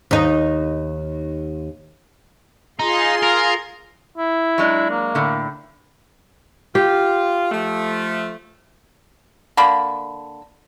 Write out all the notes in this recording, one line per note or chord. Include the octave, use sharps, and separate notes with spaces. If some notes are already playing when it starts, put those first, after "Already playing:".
D#2 D#4
D#4 F4 G#4 C6
A#4
E4
F#3 G#3 D4
A#3
A2 D3
F4 G4
F3 A3
D3 A#3 B5